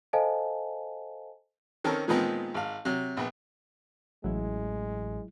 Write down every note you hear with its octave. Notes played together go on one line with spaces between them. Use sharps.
A4 C5 D#5 F5 G#5 A5
D#3 C4 C#4 A4 A#4
A#2 D#3 F3 G#3 B3 C4
G#1 F5
C3 F#3
A#1 B3
A1 F#3 G#3 E4